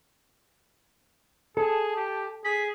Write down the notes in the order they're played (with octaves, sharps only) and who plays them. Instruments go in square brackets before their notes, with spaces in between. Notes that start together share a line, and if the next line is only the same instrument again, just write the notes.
[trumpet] G#4 [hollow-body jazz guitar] A4 [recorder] A5
[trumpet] G4
[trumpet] G#4 [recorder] B6